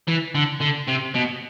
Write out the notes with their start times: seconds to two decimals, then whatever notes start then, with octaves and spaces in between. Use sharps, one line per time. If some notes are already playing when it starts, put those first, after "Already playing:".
0.08 E3
0.35 D3
0.61 D3
0.88 C3
1.14 B2